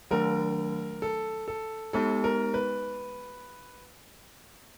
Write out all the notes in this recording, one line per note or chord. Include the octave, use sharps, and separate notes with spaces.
D#3 F#3 A3 D4 A#4
A4
A4
G#3 B3 D#4 G4 A4
A#4
B4